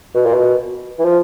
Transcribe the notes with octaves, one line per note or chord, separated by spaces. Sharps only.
B2
A#2
B2
E3
F3